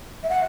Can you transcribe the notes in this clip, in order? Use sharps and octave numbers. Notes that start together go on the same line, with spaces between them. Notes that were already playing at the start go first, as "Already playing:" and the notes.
E5
F#5